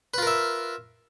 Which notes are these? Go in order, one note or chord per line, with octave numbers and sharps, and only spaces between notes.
F4 A#4 B4 E5